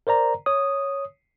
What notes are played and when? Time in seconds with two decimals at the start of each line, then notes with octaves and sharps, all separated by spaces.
0.07 A#4 C5 D5 A#5
0.46 C#5 D#6